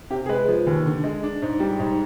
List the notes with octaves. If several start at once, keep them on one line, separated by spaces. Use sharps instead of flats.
C3 G4
G#4
G#3 B4
F3
D#2
D3
G#3
D4
G#2
G3
G#2